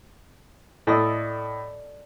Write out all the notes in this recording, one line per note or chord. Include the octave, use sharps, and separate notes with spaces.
A2 A4 D5 D#5